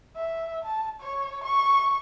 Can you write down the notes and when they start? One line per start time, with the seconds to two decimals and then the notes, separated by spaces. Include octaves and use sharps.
0.16 E5
0.64 A5
1.00 C#5
1.44 C#6